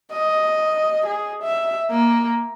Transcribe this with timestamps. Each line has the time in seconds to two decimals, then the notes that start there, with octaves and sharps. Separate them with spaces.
0.12 D#5
1.06 G#4
1.42 E5
1.91 A#3